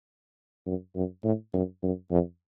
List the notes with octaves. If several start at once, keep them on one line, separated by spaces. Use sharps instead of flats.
F#2
F#2
A2
F#2
F#2
F2